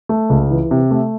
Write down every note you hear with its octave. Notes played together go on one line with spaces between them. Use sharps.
A3
C#2
E3
C3
A3